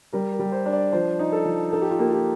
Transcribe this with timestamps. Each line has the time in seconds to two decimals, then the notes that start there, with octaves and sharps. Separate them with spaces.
0.13 G3 A#4
0.33 A#4
0.39 G3
0.52 C5
0.66 D4
0.73 D5
0.92 F3 C5
1.19 D#4
1.32 A4
1.45 F3
1.73 D#4 A4
1.82 G4
1.91 F4
1.99 A#3 G4
2.12 G4